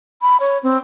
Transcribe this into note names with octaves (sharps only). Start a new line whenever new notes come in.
B5
C#5
C4